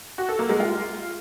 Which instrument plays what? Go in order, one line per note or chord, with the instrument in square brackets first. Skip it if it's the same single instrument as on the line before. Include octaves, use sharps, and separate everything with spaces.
[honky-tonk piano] F#4
A4
A#3
G#3
F4